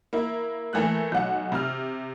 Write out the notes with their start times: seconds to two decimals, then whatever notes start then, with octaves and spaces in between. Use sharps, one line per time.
0.13 A#3 E4
0.73 E3 A3 A#3 F#6
1.12 B1 F#5
1.52 C3 F6